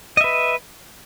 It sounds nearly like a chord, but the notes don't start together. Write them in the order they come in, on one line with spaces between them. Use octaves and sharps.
D#5 E5 B4